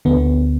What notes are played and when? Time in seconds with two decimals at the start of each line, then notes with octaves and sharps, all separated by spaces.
0.05 D2 D3 B3